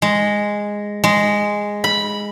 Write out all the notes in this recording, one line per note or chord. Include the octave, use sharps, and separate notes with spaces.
G#3
G#3
B5